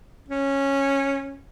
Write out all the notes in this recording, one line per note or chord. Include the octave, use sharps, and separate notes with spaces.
C#4